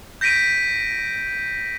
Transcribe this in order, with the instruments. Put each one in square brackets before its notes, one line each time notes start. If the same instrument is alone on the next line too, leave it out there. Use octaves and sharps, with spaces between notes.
[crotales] G6 A#6 B6 D7 D#7